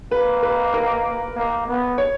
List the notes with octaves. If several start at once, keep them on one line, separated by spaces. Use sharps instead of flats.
A#3 B4
B4
A#4
A#3
B3
C#5